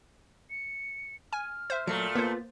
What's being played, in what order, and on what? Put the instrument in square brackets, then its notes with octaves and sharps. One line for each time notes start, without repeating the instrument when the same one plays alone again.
[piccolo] C#7
[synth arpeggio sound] G#5 [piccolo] F6
[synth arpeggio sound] C5 E5
[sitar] A#2 A3 [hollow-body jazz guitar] F#3 A#3 [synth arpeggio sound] C#7
[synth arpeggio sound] A#3 C5 [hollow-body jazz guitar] B3 F4